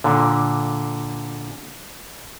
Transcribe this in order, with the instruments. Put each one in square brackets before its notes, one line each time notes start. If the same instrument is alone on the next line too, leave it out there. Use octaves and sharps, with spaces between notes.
[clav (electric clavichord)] A#2 D3